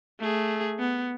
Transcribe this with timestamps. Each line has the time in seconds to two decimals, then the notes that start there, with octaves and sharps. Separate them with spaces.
0.20 A3 G#4
0.79 B3